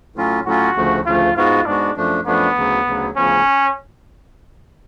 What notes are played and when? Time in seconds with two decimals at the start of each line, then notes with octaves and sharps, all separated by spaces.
0.16 A2 F#3 C#4 F4
0.45 A2 F#3 C#4 F4 F#4
0.76 D2 C#3 F3 A3
1.06 D2 C#3 F3 A3 F4
1.36 G#2 G#3 B3 F4 F#4
1.66 G#2 G#3 B3 D4 F#4
1.96 F#2 F3 A3 D4
2.26 F#2 F3 A3 B3 D4
2.56 D2 C#3 F#3
2.86 D2 C#3 F#3
3.16 D2 C#3 F3 B3 C#4